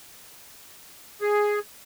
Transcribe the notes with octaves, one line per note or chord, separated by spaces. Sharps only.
G#4